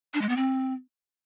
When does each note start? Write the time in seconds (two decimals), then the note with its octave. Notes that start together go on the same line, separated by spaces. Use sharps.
0.14 D4
0.21 G#3
0.29 B3
0.37 C4